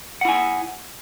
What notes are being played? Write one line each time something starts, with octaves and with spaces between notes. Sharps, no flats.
E4 F#5 G#5